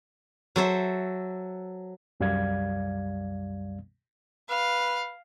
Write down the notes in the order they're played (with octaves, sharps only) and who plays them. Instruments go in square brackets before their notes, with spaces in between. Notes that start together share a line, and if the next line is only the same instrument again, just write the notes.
[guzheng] F#3 A4 C5 E5
[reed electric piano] C2 F#2 G3 D5 F5 G#6
[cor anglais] B4 [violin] F5